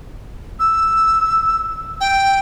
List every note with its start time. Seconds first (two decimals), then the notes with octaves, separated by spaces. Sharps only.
0.60 E6
2.01 G5